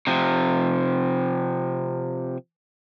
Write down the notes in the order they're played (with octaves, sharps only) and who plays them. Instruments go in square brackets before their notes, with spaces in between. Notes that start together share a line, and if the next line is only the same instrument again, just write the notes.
[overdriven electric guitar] C3 F3